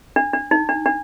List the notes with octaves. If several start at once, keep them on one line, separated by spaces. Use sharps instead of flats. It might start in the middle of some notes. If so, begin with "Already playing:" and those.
D4
D4
D#4
D4
D4